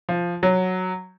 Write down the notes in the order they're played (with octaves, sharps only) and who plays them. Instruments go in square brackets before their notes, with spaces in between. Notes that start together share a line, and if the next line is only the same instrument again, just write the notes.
[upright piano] F3
F#3